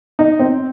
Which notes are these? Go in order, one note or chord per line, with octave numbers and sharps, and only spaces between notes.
D#4
C4